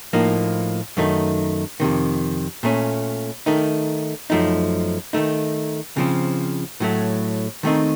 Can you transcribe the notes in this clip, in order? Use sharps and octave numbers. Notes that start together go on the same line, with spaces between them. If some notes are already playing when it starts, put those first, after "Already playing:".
A2 F3 A#3 D#4
F#2 D#3 A3 C4 D#4
F2 C3 D#3
A#2 A3 C#4
D#3 A3 D#4
F#2 F3 A3 D#4
D#3 A3 D#4
C#3 F3 C4
A2 F#3 A3
D#3 A3 C4 D#4